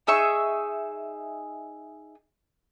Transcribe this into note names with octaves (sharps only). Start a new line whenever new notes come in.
D#4 G#4 E5 C#6